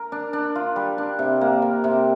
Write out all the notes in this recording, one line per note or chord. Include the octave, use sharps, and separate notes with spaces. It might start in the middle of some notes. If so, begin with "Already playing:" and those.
Already playing: A#4
D4
D4
F4
G3
D4
C3
A#3
A#4
C3